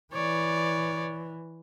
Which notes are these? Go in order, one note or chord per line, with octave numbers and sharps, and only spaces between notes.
E3 C#5 D5